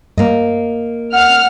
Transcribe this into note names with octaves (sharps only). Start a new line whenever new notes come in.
G2 A#3 D#5
F#5 F6